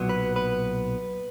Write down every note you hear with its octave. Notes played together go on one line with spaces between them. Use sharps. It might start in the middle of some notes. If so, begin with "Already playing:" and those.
Already playing: B1 A#2 F#3 B3
B4
B4